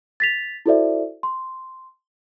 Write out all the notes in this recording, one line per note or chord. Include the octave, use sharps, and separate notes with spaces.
A6 B6 F7
E4 F#4 A4 C5 D5 E5
C6